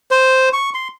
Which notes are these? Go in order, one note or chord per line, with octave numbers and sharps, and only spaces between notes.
C5
C#6
C6